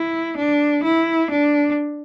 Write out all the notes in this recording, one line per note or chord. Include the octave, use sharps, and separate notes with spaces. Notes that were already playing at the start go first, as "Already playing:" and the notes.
Already playing: E4
D4
E4
D4